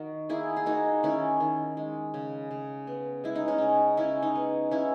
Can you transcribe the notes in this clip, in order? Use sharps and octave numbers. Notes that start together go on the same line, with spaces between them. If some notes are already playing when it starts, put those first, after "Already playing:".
Already playing: D#3 F#4
A#3 E4 G#4
G#4
A#3 D#4 F#4
D#3 C#4 E4
D#3
G#3
C#3
C#3
B3
G#3 E4
D#4
C#4
C#3 D#4
C#3 C#4 E4
D#4
B3
B3 C#4 E4